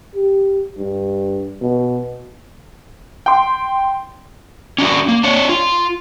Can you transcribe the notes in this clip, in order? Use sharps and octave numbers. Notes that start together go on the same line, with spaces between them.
G4
G2
B2
G5 C6
C#4 D4 F#4
A#3
D4 C#5
F4